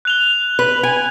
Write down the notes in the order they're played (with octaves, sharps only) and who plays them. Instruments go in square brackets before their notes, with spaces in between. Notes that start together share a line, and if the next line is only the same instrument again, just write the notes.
[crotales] F#6 F7 G7
[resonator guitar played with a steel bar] B4
G#5